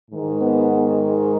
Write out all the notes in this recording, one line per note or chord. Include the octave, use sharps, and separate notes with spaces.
G#2 D#3
B3